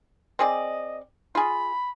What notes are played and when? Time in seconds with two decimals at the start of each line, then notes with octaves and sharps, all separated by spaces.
0.39 C4 G#4 D5 D#5
1.35 F4 G#4 B5